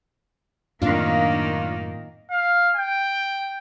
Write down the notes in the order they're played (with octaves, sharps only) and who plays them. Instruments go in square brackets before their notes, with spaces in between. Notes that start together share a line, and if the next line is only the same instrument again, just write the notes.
[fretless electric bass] F#2 A2 C4 [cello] D#3 A#3 [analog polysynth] D4 F4 F5
[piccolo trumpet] F5
G5